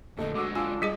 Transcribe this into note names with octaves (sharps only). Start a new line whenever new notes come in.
F2 D3 A3 D#5
D3 G#3 F#4 D6 E6
D4 F4 G#5 E6
G3 G#4 D#5 B6